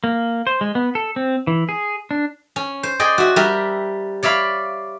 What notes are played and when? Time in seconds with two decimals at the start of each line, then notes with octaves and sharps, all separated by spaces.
0.04 A#3
0.47 C5
0.61 G#3
0.75 B3
0.95 A4
1.16 C4
1.47 E3
1.69 G#4
2.11 D4
2.56 C#4
2.83 C5
3.00 G#4 D5 D#5 G5
3.18 F#4 E5
3.36 G3 A#4 E5
4.23 C#5 D5 E5 F5 B5